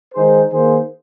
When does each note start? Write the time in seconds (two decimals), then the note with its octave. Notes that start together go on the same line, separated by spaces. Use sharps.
0.14 D#3 G#3 D#4 G#4 C5
0.49 D#3 A#3 G#4 C5